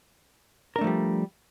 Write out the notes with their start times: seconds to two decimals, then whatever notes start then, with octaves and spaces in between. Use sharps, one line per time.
0.76 A#4
0.79 D4
0.81 A3
0.84 F3
0.87 G3